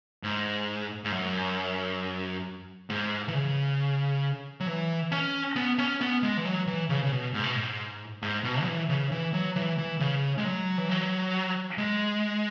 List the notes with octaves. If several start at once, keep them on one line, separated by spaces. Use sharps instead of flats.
G#2
G#2
F#2
G#2
E3
C#3
F#3
E3
C#4
B3
C#4
B3
G#3
E3
F#3
E3
C#3
C#3
B2
G#2
B2
G#2
G#2
B2
F#3
E3
C#3
E3
F#3
E3
E3
C#3
G#3
F#3
E3
F#3
G#3